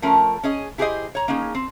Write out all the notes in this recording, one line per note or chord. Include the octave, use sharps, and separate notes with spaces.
F3 A3 C#4 A#4
C#4 G#4 D#5
E4 G4 G#4 A#4 C5 D#5
C#5 A#5
A#3 C#4 D#4 G#4
C4